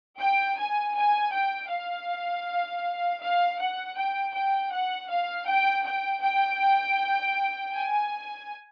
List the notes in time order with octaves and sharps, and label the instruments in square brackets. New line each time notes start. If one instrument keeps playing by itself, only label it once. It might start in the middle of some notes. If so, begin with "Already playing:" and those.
[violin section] G5
G#5
G#5
G5
F5
F5
F#5
G5
G5
F#5
F5
G5
G5
G5
G#5